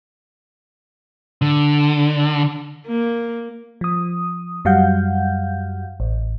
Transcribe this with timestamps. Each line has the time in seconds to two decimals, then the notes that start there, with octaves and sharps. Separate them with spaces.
1.42 D3
2.87 A#3
3.81 F3 D#6
4.65 F#2 F#3 G3 F5 F#5 G6
6.00 A1